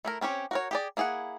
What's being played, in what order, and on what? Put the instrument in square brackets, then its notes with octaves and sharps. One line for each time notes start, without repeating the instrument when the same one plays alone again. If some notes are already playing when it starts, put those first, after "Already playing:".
[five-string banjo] A3 E4 A#4
C4 C#4 G4 C#5
F#4 A#4 C#5
G4 G#4 D5
A#3 E4 G#4 C#5 F#5